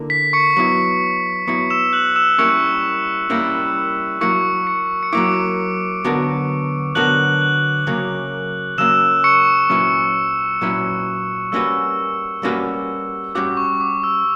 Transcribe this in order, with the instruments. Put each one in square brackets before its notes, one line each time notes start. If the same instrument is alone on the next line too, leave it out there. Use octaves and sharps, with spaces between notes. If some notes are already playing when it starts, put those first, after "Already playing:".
Already playing: [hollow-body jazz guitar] D3 A#3 E4
[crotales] B6
C#6 C#7
[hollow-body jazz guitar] F#3 B3 E4
[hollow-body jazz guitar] F#3 B3 E4 [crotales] C#6 C#7
[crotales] E6 E7
F#6 F#7
E6 E7
[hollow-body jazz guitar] G3 A#3 C#4 E4 A#4 [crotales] C#6 C#7
[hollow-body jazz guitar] G3 A#3 C#4 E4 A#4
[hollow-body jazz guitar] F#3 A#3 E4 [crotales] C#6 C#7
[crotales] C#6 C#7
C#7
[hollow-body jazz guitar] F#3 A#3 E4 [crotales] D6 D7
[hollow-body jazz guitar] D3 F#3 B3 F#4 A#4
[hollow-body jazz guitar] D3 F#3 B3 F#4 A#4 [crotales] F#6 F#7
[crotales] F#6 F#7
[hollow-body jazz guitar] C#3 F#3 A#3 C#4
[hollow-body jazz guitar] C#3 F#3 A#3 C#4 [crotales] E6 E7
[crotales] C#6 C#7
[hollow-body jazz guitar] A#2 F#3 C#4 E4 B4
A#2 F#3 C#4 E4 B4
[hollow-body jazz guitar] G3 A#3 C#4 F#4 B4 [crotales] E6
[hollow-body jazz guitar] G3 A#3 C#4 F#4 B4
[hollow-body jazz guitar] G3 C#4 F#4 [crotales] D6
[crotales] C#6
D6
E6